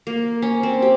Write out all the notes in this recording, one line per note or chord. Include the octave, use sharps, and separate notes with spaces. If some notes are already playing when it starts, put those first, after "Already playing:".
A#3
C#4
C4
G4